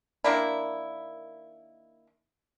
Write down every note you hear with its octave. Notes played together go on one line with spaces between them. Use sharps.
D#3 A#3 D4 E4